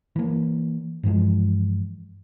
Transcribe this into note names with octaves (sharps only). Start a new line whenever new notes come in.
E3 A#3
G2 E3 F3 G#3